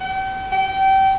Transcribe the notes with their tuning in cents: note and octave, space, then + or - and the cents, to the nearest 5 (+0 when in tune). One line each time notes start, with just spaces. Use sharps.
G5 -40
G5 -25